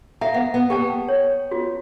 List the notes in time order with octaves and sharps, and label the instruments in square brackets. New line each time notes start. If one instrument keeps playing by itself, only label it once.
[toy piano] E5 A#5 [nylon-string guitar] F5
[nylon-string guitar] B3 [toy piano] F#5
[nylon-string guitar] B3
[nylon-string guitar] B3 [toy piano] G4 G5 A5
[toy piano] C#5
F4 F#4